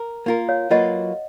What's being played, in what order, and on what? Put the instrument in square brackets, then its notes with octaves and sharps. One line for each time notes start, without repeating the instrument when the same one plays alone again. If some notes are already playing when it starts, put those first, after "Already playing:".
Already playing: [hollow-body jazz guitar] A#4
A#3 F4 A#4
[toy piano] C#5 F5
[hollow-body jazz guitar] F#3 A#3 F4 B4 [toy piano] D#5 F#5